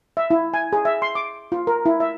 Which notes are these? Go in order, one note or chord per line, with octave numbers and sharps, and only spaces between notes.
E5
E4
G#5
G#4
E5
C6
D6
F4
A#4
E4
E5